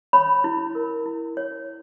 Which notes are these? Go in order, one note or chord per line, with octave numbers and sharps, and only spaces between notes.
C#5 B5
E4
A#4
E4
C#5